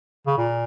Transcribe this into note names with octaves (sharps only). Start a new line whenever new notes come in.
C#3
A#2